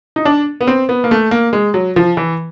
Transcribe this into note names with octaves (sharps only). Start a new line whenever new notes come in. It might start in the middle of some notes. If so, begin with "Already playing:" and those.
D#4
D4
B3
C4
B3
A#3
A3
A#3
G#3
F#3
F3
E3